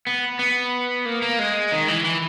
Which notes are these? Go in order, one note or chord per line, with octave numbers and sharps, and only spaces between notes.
B3
B3
A#3
A#3
G#3
D#3
E3
E3